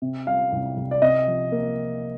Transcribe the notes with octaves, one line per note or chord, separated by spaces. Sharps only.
C3
G3 F5
C2
C2
D5
C3 D#5
F3
A#3